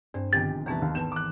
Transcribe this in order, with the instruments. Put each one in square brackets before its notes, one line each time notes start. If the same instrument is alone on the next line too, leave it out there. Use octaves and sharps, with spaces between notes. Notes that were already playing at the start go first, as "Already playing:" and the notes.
[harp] G2 [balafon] C4 [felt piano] C5
[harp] A#1 D#3 G#3 [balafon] D3 B3 C4 [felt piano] G4 [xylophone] A6
[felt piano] F1 E3 [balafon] B3 C4 E4 [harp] B4 A5 A#5
[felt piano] D#2
[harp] G#1 E3 D7 [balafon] B3 B4 A5 [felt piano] E7
[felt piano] D6 F#6